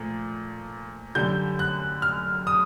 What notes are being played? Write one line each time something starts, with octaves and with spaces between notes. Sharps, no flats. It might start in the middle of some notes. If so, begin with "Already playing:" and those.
Already playing: A#2 F3 A3
F#2 D3 G3 G6
F#6
F6
D#6